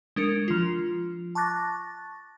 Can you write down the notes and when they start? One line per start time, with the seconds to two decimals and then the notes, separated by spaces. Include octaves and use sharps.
0.16 G#3 D4 A#4 C#7
0.48 F3 F4
1.35 A5 C#6 D6 F#6 A6 A#6